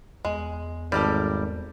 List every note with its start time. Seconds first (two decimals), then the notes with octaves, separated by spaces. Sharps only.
0.25 E2 G#3
0.92 G#1 G3 A4 A#4 D5